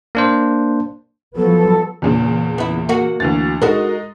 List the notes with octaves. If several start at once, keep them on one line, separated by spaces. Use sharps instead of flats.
A#3 D4 C5
F3 F#3 B3 A4
E2 A#2 C#3
B3 E4
A#3 F#4
D2 E3 A6
G#3 D#4 F#4 A#4 D#5